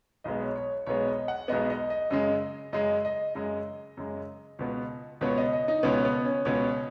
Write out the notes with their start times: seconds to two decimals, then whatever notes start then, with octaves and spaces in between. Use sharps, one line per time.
0.24 B1 B2 G#3 B3 D#5
0.40 C#5
0.56 C#5
0.86 B1 B2 G#3 B3 C#5
1.08 D#5
1.28 F#5
1.48 B1 B2 G#3 B3 D#5
1.70 D#5
1.90 D#5
2.10 F#2 C#3 G#3 D#5
2.73 F#2 C#3 G#3 D#5
3.05 D#5
3.35 F#2 C#3 G#3 D#5
3.97 F#2 C#3 G#3
4.59 C#2 B2 B3
5.21 C#2 B2 B3 C#5
5.38 D#5
5.53 D#5
5.68 D#4
5.83 C#2 B2 B3 C#4
6.05 B3
6.24 C#4
6.45 C#2 B2 B3 C#4